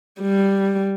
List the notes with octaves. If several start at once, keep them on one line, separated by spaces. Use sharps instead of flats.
G3